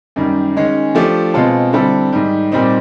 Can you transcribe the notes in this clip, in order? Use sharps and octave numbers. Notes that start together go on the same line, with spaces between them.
F#2 D#3 G3
D#3 G#3 C#4
F3 A3 D4 G4
B2 G#3 C4 F4 A4
D3 G3 C4 E4 A4
G#2 D#3 G3
A#2 G3 C4 D#4